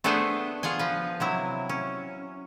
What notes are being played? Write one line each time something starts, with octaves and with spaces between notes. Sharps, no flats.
A3 B3 D4 G#4 B4 C5
F4 G#4 F#5 G#5
F3 B4
C3 F#3 E4
C#4